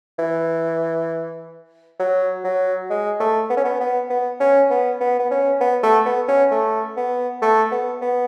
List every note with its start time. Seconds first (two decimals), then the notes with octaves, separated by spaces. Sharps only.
0.19 E3
1.99 F#3
2.44 F#3
2.90 G#3
3.20 A3
3.50 B3
3.57 C#4
3.64 B3
3.80 B3
4.10 B3
4.40 C#4
4.70 B3
5.01 B3
5.19 B3
5.31 C#4
5.60 B3
5.83 A3
6.05 B3
6.28 C#4
6.51 A3
6.97 B3
7.42 A3
7.72 B3
8.02 B3